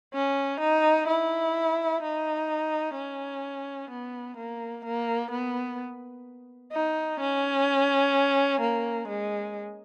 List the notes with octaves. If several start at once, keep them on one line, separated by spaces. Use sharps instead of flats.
C#4
D#4
E4
D#4
C#4
B3
A#3
A#3
B3
D#4
C#4
A#3
G#3